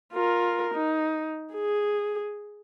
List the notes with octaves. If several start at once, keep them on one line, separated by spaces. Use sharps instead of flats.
F4 A#4
D#4
G#4